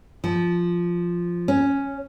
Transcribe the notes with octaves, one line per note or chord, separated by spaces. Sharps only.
F3
C#4